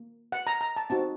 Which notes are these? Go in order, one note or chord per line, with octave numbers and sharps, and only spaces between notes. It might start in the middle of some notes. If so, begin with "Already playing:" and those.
Already playing: A#3
F#5
A#5
A#5
A5
C4 D#4 F#4 A5